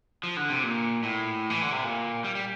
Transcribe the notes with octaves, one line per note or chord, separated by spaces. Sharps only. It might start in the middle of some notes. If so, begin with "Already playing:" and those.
F3
D3
C3
A#2
A2
E3
D3
C3
A#2
G3
G3